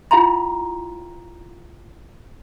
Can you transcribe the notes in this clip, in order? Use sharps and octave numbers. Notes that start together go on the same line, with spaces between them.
E4 F4 F5 G5 A#5 C6